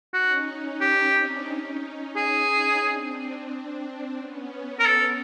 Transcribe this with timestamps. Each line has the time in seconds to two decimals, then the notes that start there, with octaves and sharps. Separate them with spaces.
0.13 C#4 D#4 F#4
0.47 C#4 D#4
0.80 C#4 D#4 G4
1.15 C4 D4
1.48 C#4 D#4
2.16 G#4
2.83 C4 D4
4.19 B3 C#4
4.79 A#4
4.86 B3 C#4 A4